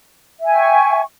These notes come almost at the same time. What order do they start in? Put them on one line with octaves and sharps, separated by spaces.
E5 G#5 G5 C#6